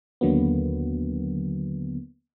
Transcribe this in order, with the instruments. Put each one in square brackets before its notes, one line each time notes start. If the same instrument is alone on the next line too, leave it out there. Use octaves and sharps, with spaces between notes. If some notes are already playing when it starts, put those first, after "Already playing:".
[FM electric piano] D#2 D3 F#3 A#3 B3